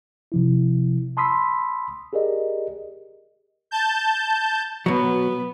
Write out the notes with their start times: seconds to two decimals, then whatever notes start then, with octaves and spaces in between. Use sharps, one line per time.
0.32 C3 F3 E4
1.17 A5 B5 C6 D#6 E6 B6
2.13 G4 G#4 A#4 D5 D#5
3.71 A5 G6
4.86 B2 F#3 B3